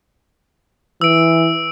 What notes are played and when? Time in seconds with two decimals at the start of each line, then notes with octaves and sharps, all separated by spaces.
1.01 E3 E6 D7